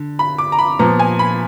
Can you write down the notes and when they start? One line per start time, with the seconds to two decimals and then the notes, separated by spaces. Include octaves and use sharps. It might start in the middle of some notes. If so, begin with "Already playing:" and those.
Already playing: D3
0.19 B5
0.38 D6
0.52 A#5
0.59 B5
0.79 A#2 F3 B3 A#5
0.99 G#5
1.19 B5